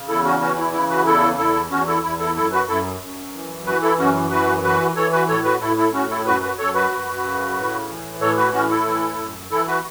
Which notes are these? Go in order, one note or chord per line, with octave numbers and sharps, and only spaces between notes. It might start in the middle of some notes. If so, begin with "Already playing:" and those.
Already playing: C#3
E2 E4 A4
C#4 F#4
E3 C#4 F#4
E4
C#3 E4
F#4 B4
E2 E4 A4
E2 E4 A4
E2 C#4 F#4
E4 A4
E2 E4
E4 A4
F#2 E4 A4
F#4 B4
F#2 E4 A4
F#2
E3
E3 F#4 B4
E4 A4
F#2 C#4 F#4
E3 F#4 B4
E3 F#4 B4
E3 A4 C#5
F#4 B4
A2 A4 C#5
F#4 B4
A2 E4 A4
E4 A4
A2 C#4 F#4
E4 A4
F#2 F#4 B4
F#4 B4
F#2 A4 C#5
F#4 B4
F#2
C#3
A2
E3
A2 A4 C#5
F#4 B4
A2 C#4 F#4
E4 A4
E3
F#2
E3 E4 A4
F#4 B4